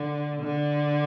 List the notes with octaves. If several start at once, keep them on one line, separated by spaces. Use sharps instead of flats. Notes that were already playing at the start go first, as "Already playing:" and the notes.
Already playing: D3
D3